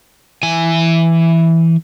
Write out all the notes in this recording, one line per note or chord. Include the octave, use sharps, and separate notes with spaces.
E3 G#5